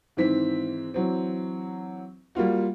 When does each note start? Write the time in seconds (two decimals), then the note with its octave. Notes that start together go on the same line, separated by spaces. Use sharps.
0.17 G#2 D#3 E3 C4 B6
0.94 E3 F#3 C4
2.35 G3 A#3 F4 F#4